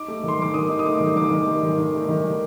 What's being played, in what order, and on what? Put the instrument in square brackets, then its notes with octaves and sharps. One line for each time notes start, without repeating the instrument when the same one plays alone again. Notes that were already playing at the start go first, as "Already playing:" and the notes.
Already playing: [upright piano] D#4 D6
A3
D#3 C6
D#3 D6
D#3 D#6
D#4
D#6
A3 D6
D#3
D#3 D6
D#3
A3
D#3
D#3
A3
D#3
D#3